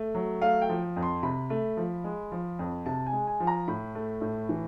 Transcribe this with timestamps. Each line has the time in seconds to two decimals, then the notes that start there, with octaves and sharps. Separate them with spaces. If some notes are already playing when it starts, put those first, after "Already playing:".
Already playing: A3
0.14 F#3
0.41 A3 F5
0.62 G5
0.69 F3
0.96 F2
1.03 C6
1.23 C3 B5
1.50 A3
1.77 F3
2.04 G#3
2.32 F3
2.59 F2
2.86 C3 A5
3.06 G#5
3.12 G#3
3.27 G#5
3.40 F3
3.47 A#5
3.67 A2 B5
3.95 A3
4.21 A2
4.49 E3